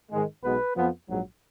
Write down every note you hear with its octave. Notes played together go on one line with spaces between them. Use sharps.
G#2 D#3 G#3
B1 B2 G#3 B3 B4
F2 F3 B3
A#1 G#2 F#3